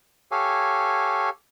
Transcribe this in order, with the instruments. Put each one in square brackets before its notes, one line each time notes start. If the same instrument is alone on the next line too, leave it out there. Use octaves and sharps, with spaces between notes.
[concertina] G4 A4 C#5 F5 G#5